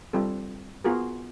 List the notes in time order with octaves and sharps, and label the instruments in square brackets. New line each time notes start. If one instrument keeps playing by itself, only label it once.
[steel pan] G3 C4 F4 A4
B3 F4 F#4 G#4 A#4